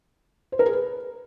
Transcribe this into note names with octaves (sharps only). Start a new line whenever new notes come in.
C5
A#4
G#4
B4